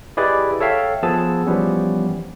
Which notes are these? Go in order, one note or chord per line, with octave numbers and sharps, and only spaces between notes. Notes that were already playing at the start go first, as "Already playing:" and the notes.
E4 G4 G#4 B4 D5 D#5
A4 C#5 E5 F5 G5
F3 B3 G#4 A5 E6
E3 F3 G3 B3 C#4